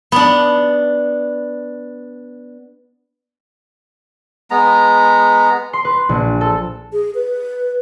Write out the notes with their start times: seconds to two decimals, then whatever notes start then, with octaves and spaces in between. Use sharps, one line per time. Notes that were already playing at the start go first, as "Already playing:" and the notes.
0.12 B3 D4
4.51 G#3 B3 A#5
5.73 C6
5.85 B4
6.09 A#1
6.41 A4
6.92 G#4
7.15 B4